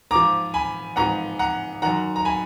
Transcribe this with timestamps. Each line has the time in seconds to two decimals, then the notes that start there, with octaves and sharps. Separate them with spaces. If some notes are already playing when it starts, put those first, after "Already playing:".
0.11 G#2 F3 A#5 D6
0.54 G#5 B5
0.96 G#2 F3 F#5 A#5
1.39 F#5 A#5
1.82 F#2 D#3 F#5 A#5
2.16 A#5
2.25 G#5 B5